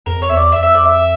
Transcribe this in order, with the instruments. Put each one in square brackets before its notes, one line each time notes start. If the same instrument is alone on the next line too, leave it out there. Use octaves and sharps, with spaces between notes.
[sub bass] F2 [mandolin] A#4
[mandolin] C#5
[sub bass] E2 [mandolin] E5
[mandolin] D5
[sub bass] F2 [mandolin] E5
[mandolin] E5
D5
E5